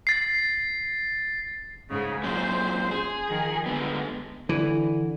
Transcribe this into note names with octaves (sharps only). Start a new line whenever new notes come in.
A6 C7
G#2 C#3
A#2 F#3 C#4 C5
G#4
D#3 F3
D3 G#3 B3
D3 E3